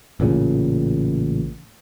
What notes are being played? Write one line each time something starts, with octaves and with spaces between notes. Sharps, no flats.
A1 A#2 C#3